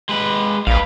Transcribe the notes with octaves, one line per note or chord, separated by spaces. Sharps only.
G#3 B4
A#1 B4 F5